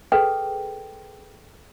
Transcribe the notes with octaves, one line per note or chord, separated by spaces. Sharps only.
G#4 A4 B4 G5